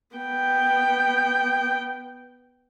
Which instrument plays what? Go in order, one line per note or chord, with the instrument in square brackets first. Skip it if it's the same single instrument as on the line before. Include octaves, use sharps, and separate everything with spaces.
[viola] B3 G5